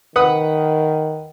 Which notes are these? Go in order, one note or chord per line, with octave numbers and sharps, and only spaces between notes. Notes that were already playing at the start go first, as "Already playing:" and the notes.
D#3 B4 F#5 D#6